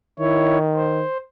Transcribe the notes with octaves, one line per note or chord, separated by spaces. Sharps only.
D#3 E4 C#5
C5